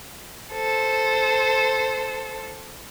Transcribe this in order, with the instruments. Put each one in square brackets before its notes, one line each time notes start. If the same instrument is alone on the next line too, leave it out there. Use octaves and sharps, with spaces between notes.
[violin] A4 C5